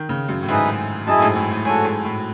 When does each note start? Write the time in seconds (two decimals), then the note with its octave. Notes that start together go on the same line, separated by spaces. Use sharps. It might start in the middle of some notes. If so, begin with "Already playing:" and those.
Already playing: D#3
0.09 C#3
0.29 F#2
0.43 A2
0.48 G#2 D#4 G#4 B4 E5
1.06 F#2 E4 G#4 D#5 A5
1.18 A2
1.22 G#2
1.36 A2
1.51 A2
1.65 G#2 F#4 A4 C#5 G#5
1.85 G#2
2.05 A2